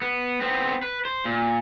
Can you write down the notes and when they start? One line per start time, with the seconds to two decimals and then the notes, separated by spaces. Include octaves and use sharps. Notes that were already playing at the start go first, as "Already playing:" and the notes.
0.02 B3
0.41 B3 C4
0.83 B4
1.05 C5
1.25 A#2